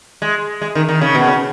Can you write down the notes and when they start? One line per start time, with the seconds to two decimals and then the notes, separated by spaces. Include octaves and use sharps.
0.22 G#3
0.61 G#3
0.75 D#3
0.89 D#3
1.01 C#3
1.15 B2
1.28 C#3